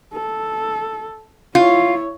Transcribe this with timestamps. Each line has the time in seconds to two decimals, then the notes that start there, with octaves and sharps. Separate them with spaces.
0.13 A4
1.55 E4 F4 C#5